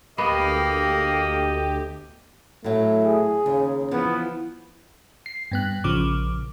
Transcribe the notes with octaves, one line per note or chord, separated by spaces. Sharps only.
D2 A#3 B3 G4 D#5
A2 F#3 A3
G#4
D#2 C#3
E3 F3 B3
C7
G2 B3 F#6
A#1 C#3 F3 D6